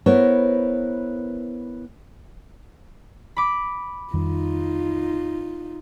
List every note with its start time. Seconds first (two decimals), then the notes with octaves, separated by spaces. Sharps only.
0.06 B3 E4 A#4 C5 C#5
3.37 B5 D6
4.14 F2 D#3 G3 D#4 F4